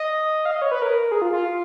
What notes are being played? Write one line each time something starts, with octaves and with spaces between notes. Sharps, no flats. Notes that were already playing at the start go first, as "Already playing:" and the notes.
Already playing: D#5
F5
D#5
C#5
B4
A#4
G#4
F4
F4